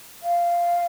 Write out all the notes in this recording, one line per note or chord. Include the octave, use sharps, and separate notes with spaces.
F5